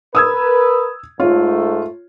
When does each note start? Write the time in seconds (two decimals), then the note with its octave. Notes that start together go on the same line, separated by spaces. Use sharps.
0.15 A#4 B4 D#6 E6 G#6
1.20 G#2 A3 F4 C#5